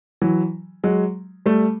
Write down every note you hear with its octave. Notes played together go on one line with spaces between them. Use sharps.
E3 F#3
F#3 G#3
G3 A3